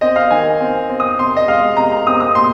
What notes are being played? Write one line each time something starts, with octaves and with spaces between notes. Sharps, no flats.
C4 D#5
F5
D#3 G#5
C4
C4
D#6
C3 C6
D#5
G#3 F5
C3 A#5
A#5
C4 D#6
D#6
A#2 C6